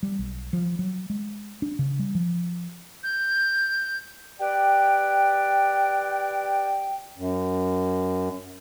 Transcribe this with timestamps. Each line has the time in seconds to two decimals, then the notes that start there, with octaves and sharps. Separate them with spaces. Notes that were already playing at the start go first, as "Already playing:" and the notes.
0.03 G3
0.19 B1
0.53 F3
0.79 F#3
1.10 G#3
1.62 D4
1.79 C#3
1.99 G3
2.15 F3
3.03 G6
4.39 G4 B4 D5 G5
7.18 F#2